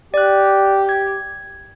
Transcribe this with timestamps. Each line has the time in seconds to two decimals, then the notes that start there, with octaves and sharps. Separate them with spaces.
0.14 G4 D5 F#6
0.89 G#6